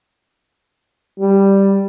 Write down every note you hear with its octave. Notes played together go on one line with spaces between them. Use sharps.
G3